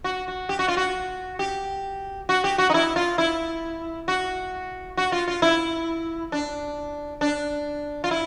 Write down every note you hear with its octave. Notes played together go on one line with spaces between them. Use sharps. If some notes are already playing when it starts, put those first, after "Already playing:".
F#4
F#4
G4
F#4
F4
F#4
G4
F#4
G4
F#4
D#4
E4
F4
E4
F#4
F#4
F4
F4
E4
D4
D4
F4
E4